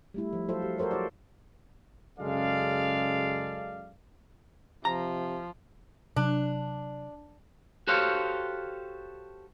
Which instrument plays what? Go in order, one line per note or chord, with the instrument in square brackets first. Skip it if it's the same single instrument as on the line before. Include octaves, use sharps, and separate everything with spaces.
[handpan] G3 A3 E4
F3
F#3 F4 A4 C5 E5
G4
F#4 A4 A#4 C5 C#5
F4 C5 D5
[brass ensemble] F#2 C#3 G#3 A4 D5 F5
[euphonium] C3 [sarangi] F3 [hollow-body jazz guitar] A#5
[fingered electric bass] C3 F#3 [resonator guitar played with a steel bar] D4
[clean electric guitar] F#4 G4 A4 C5 C#5 F5